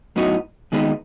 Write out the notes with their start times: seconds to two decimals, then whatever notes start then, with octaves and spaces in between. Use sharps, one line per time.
0.16 A2 F#3 B3 D#4 F#4
0.72 D#2 D#3 G#3 B3 D#4